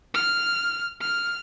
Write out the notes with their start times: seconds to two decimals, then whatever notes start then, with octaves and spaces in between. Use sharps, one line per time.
0.15 F6
1.01 F6